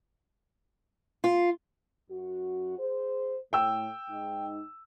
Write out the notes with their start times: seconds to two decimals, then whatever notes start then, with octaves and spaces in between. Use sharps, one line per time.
1.24 F4
2.10 F#2 F#4
2.79 G#4 C5
3.53 A2 G5 E6
4.10 G#2 D#4